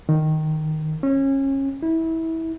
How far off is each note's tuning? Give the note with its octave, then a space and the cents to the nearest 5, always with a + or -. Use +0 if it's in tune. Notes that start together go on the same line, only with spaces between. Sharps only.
D#3 -5
C#4 -25
E4 -25